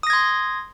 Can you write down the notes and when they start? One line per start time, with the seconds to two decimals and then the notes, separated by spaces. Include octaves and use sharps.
0.03 D#6
0.07 A#6
0.10 G#6
0.13 C6